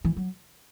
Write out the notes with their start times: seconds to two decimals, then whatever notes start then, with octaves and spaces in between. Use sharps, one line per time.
0.05 E3
0.16 F#3